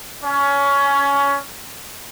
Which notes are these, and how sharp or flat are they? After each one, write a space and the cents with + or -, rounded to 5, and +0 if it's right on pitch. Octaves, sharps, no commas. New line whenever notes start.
C#4 +20